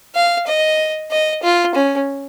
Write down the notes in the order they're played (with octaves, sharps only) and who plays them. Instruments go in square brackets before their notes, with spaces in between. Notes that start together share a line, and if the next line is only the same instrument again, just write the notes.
[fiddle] F5
D#5
D#5
F4
C#4